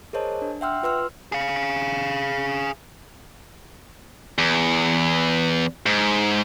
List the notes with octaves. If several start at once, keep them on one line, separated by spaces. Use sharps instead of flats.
G#4 A#4 C5 C#5 D#5 A5
D4
E5 F#5 G5 C6 E6 F6
F4 B4 C6 E6 F6
G#4 F5
E2
G#2